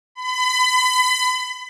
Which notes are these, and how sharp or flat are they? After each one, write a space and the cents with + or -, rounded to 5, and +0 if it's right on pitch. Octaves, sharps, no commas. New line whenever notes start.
B5 +35